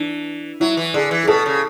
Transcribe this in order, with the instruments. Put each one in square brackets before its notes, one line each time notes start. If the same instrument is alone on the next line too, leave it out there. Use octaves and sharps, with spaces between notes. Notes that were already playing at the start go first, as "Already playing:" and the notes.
Already playing: [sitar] E3 [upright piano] D4
[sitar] F#3 [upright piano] E4
[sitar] E3
[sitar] D3 [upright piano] G#4
[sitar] E3
[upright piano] G#4
[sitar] B2 [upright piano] A4
[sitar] C#3